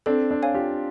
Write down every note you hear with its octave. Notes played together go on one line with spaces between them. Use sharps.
C4 D4 A4
C4 D4
C#5 F5 G#5
F4 G4